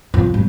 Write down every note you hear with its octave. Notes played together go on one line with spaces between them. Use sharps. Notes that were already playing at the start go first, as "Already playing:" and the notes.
F3
G3